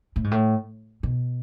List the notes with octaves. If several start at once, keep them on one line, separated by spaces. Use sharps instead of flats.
A2
G#2
A2
B2